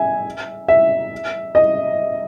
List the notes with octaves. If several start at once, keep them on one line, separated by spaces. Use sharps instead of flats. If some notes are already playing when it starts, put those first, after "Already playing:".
Already playing: E5 G#5
E5
D#5